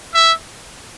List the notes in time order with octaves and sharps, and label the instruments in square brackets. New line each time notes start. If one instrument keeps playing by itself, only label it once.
[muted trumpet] E5